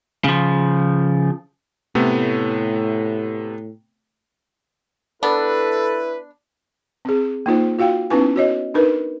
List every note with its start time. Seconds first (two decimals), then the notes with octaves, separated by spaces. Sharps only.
0.24 C#3 F3
1.95 A2 C3 A3 B3
5.23 B3 D4 E4 A4 B4
7.05 C4 G#4
7.46 A#3 D#4 F4 C5
7.79 F4 F#4 F5 G5
8.10 B3 C#4 D#4 E4 B4 G#5
8.36 F#4 C#5 D#5
8.74 D4 D#4 A#4 B4